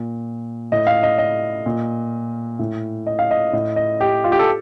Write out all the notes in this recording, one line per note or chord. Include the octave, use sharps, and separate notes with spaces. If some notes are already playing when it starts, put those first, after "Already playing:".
Already playing: A#2
A2 D#5
F5
D#5
D#5
A#2
A2
D#5
F5
D#5
A2 D#5
D#5
G4
F4
G4
A4